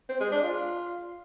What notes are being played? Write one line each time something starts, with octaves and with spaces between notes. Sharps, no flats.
C4
G#3
D4
F4